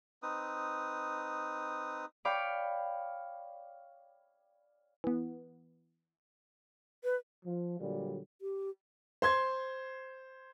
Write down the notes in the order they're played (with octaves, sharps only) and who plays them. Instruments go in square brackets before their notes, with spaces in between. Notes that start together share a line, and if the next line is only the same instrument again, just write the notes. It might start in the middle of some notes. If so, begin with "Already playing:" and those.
[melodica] C4 D#4 B4 D#6
[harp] C#5 D5 F5 G5 B5 D6
[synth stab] E3 B3
[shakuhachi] B4
[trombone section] F3
A#2 D3 F#3 G3
[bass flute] G4
[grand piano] C5 C6 G#6